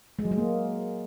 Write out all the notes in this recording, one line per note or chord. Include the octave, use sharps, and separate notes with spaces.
G#3
F#3
G#3
A#3